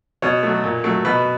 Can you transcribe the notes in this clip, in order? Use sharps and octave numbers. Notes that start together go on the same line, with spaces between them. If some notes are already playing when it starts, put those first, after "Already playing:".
B2 C#5
F#3 A3
A#2
F#3 A3
B2 B4